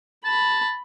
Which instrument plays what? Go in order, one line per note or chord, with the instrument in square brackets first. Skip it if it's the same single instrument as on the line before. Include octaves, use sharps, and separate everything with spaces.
[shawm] A5 [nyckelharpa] B5